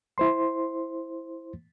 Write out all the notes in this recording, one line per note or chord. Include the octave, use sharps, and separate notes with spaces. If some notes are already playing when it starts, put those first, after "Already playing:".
E4 C5 C6